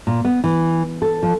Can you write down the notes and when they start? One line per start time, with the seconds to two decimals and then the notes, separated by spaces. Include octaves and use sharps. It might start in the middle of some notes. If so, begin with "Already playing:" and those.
0.07 A#2
0.25 B3
0.44 E3
1.02 A4
1.23 F3